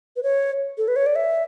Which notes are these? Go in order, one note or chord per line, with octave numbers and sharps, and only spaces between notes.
B4
C#5
A4
B4
C#5
D5
E5